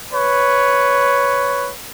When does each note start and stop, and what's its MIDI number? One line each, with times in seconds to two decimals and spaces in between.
0.12 1.71 71
0.12 1.71 73